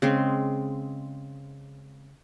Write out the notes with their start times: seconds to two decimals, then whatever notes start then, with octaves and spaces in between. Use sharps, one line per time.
0.02 C#3 G#3 C4